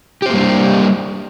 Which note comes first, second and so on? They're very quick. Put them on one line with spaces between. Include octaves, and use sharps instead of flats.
G4 C5 A#3 G3 D4